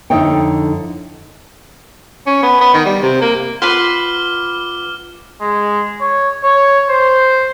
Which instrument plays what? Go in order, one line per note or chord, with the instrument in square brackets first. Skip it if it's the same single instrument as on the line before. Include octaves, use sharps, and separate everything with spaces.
[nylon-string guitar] F2 D3 D#4 E4 C#5 G5
[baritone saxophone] C#4
B3
B3
D#3
G3
C3
A#3
[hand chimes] F4 F#5 [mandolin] B4 B5 C6 [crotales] D6 F6 G7
[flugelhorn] G#3
C#5
C#5
C5